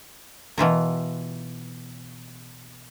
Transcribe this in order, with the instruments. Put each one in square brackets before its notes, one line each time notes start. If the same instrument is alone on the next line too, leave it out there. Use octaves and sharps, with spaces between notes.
[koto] B2 E3 F4 A#4